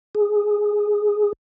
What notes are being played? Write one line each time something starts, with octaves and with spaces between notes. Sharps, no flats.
G#4